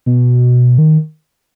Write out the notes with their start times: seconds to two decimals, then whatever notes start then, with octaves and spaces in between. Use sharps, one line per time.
0.06 B2
0.78 D#3